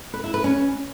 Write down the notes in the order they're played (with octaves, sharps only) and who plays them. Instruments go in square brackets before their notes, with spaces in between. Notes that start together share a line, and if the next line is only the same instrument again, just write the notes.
[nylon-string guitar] B4
E4
B4
C#4